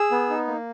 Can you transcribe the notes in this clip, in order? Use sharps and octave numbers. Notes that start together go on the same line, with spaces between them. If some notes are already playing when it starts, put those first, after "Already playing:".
Already playing: G#4 E6
B3
D#4
A#3